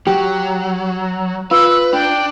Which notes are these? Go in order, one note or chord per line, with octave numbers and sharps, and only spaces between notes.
F#3 G4
F4 B4 E6
D4 G5